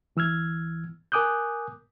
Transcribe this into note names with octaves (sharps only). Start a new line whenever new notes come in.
D2 E3 E6 F6 G#6
A#4 G#5 D6 D#6 F#6 G6